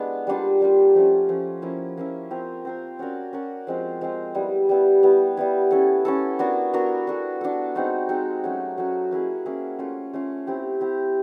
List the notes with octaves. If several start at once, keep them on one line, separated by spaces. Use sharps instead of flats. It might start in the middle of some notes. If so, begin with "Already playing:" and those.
Already playing: G#3 B3 D4 E4
G3 A#3 D4 F4
G3 A#3 D4 F4
F3 A3 C#4
F3 A3 C#4
F3 A#3 C#4 E4
F3 A#3 C#4 E4
C4 F4 A#4
C4 F4 A#4
C#4 F#4 A#4 D5
C#4 F#4 A#4 D5
F3 G#3 C4 F4
F3 G#3 C4 F4
G3 B3 E4
G3 B3 E4
G3 B3 E4
G3 B3 E4
C#4 E4 A4
C#4 E4 A4
B3 D4 F#4 A#4
B3 D4 F#4 A#4
D4 F#4 A4
D4 F#4 A4
G#3 C4 D#4 F#4
G#3 C4 D#4 F#4
F#3 A3 C#4 F#4
F#3 A3 C#4 F#4
A#3 C#4 E4 G#4
A#3 C#4 E4 G#4
A3 C#4 F4
A3 C#4 F4
C4 E4 G4
C4 E4 G4